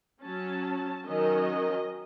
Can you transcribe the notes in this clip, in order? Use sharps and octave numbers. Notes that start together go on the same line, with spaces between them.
F#3 C#4 A5
D#3 F#3 C#4 D#5